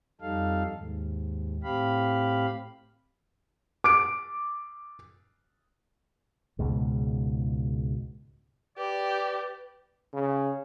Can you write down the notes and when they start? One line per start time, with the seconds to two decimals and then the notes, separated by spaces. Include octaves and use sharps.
0.21 F2 G3 D#4 A4 F5
0.72 D#2 G#2
1.63 A2 C4 G4 F5 B5
3.84 D6 D7
6.59 C#2 G#2 B2
8.77 G4 B4 D5
10.14 C#3